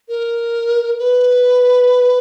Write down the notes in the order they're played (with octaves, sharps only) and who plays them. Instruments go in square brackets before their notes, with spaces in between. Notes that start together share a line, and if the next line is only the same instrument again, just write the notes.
[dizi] A#4
B4